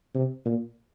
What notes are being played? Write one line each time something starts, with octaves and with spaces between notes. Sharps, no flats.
C3
A#2